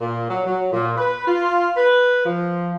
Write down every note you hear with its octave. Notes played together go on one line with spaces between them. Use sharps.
A#2
F#3
F#3
A#2
B4
F4
B4
F3